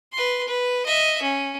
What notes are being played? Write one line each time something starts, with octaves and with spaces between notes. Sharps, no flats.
B4 C6
B4
D#5 E5
C#4